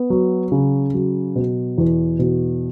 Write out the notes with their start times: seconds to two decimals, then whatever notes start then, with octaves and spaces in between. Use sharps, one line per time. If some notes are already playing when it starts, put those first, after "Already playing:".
Already playing: B3
0.10 F#3
0.52 C#3
0.94 F#3
1.36 B2
1.78 E2
2.19 B2